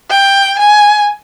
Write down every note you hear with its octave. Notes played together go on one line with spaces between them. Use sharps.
G5
G#5